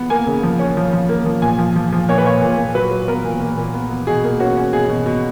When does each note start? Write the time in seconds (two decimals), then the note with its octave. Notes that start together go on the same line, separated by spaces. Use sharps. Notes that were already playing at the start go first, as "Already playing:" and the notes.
Already playing: B3
0.10 A#3 G#5
0.27 C#3
0.43 F3
0.59 C#4
0.77 F3
0.93 F3
1.09 A#3
1.26 F3
1.42 A#2 G#5
1.58 F3
1.76 F3
1.92 F3
2.08 A#2 C#5
2.18 B4
2.25 A#2 C#5
2.41 A#2
2.58 A#2
2.74 F#3 B4
2.91 F#3
3.08 B3 A#4
3.24 A#2
3.40 A#2
3.57 A#2
3.74 B3
3.90 B3
4.07 B2 G#4
4.24 A#3
4.40 C#4 F#4
4.56 C#4
4.73 B2 G#4
4.89 B2
5.06 B2